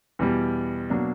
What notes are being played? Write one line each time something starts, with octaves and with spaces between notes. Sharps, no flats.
E2 B2 G3
B2 F#3 A#3 D4